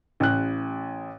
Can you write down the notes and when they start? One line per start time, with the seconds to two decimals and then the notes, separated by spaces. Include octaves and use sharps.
0.20 A1 F#6